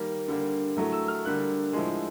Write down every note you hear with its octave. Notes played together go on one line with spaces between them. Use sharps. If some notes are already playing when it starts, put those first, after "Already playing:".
Already playing: D#3 G3 A#3
D3 G3 A#3
A2 F#3 A3
E6
F6
D3 G3 A#3 F#6
A2 F3 G#3